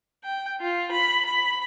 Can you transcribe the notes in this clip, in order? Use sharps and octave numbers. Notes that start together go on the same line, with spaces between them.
G5
F4
B5
B5